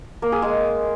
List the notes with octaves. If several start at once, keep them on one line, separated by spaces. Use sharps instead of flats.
A#3
G#4
G#3